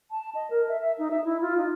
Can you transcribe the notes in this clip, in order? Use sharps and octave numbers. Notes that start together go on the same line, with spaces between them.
A5
D#5
A#4
E5
E5
D#4
E5
E4
F4
D#4